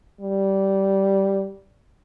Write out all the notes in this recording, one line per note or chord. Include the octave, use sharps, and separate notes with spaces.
G3